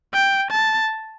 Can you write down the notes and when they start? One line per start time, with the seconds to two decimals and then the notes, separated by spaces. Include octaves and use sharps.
0.14 G5
0.52 A5